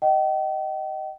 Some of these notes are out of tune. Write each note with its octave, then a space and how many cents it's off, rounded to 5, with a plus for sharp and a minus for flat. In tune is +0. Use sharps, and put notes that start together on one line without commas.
D#5 +0 G5 -40